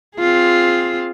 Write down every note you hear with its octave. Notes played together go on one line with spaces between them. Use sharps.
C4 F4 G#4